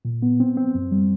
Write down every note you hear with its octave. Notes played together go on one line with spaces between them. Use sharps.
A#2
B3
C4
C4
F#2
G3